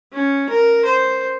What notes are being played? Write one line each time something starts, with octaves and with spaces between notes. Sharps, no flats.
C#4
A#4
C5